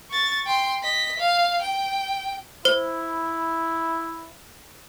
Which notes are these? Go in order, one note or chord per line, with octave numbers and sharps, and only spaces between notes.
C#6 A6
G5 C6
D#5 B6
F5
G5
E4 C5